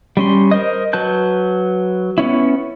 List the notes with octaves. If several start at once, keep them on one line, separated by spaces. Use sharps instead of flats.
G3 C#4 C6
A#4 C5 D#5
F#3 B4 A5 G6
B3 C#4 E4